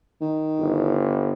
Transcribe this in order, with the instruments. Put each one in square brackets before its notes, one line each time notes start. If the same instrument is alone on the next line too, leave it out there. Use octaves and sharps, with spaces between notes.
[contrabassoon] D#3
[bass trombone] G1